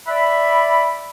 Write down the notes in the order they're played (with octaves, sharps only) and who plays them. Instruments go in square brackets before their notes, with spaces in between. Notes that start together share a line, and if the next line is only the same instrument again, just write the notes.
[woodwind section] D5 E5 B5